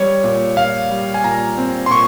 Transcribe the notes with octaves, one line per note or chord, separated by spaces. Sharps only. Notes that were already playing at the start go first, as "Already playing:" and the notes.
Already playing: G3 C#5
A#2
A#2 F5
G3
G#5
A#2 A#5
C4
C6
A#2 C#6